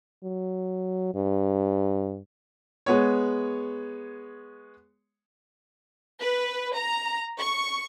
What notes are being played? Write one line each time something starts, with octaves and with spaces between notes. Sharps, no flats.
F#3
G2
G#3 B3 C#5
B4
A#5
C#6